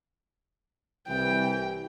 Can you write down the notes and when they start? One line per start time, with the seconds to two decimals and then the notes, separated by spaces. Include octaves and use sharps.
1.08 C2 E3 G5